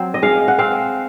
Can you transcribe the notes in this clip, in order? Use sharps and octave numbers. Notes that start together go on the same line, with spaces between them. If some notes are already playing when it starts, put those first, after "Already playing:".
Already playing: F#3 C4
D#5
G#3 F5
F#5
C4 F5